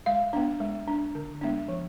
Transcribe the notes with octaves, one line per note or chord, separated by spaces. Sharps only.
G#3 F5
B3 D4
G#3
D4
D3
G#3 B3 D4
F3